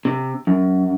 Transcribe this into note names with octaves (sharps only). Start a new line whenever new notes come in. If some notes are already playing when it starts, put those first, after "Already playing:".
C3
F#2